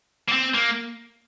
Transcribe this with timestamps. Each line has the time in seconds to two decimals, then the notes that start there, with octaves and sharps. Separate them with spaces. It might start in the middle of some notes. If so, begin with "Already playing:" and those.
0.29 A#3
0.33 C4
0.54 A#3